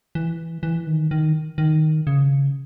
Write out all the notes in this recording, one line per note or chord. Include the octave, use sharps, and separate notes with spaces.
E3
E3
D#3
D#3
D#3
C#3